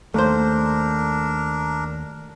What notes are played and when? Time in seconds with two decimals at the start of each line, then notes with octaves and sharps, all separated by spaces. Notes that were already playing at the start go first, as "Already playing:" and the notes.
0.14 D#2 A3 D4 A#4 C5